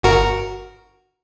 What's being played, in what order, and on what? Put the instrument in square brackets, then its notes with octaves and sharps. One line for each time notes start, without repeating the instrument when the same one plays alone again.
[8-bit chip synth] G1 F#4 A#4